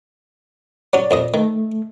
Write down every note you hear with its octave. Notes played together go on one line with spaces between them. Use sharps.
F#3 C#4 D5
A#1 F2 D#5
D#3 A3